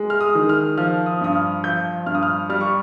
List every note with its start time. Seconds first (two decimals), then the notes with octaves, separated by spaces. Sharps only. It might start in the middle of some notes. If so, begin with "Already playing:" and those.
Already playing: G#3
0.10 F6
0.20 D#6
0.35 D#3
0.49 F6
0.78 F3 F6
1.06 D#6
1.21 G2 D#6
1.35 F6
1.64 F3 G6
2.06 G2 F6
2.15 D#6
2.22 F6
2.49 G3 F6
2.61 C#6